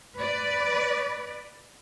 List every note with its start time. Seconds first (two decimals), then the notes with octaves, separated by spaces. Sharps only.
0.15 B4 D5